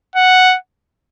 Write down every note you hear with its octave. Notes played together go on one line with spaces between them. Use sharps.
F#5